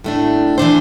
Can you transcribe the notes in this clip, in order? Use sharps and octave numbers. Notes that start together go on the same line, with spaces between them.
A2 A3 D4
E3 A3 D4 C5